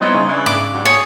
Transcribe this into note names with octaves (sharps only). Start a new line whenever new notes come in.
G3 B3 C4 D#4 E4 C#5
C#3
E3 D4 G#6
G#2 D6
G2 F#3
G#4 C#5